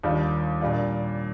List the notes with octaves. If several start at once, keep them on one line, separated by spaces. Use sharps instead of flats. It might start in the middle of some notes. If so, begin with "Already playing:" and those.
D#2 D#3 G3 D4 F4
A#2 G3 D4 F4